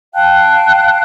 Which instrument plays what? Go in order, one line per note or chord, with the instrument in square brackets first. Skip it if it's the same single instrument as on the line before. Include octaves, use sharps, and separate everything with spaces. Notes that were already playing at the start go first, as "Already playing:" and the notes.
[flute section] F5 G5 A5 F#6